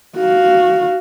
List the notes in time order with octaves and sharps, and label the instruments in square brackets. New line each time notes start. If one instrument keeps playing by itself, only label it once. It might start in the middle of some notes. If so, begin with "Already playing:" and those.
[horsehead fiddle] F#4 F5